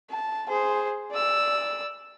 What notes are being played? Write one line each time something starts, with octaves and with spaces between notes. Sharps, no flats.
A5
G#4 C5
D5 E6